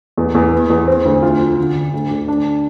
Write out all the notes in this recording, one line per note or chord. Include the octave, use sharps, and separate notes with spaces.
E2
E2
B3
E2
C4
D2
F4
F3
D3
D3
D2
D2
D4